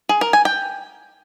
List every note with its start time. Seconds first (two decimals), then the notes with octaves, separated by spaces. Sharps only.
0.09 G#4
0.21 A#4
0.33 G#5
0.45 G5